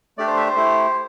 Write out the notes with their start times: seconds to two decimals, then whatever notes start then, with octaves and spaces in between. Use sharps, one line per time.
0.18 A3 D4 G4 D5
0.27 C5
0.37 E5
0.47 C5
0.56 A3 E4 G4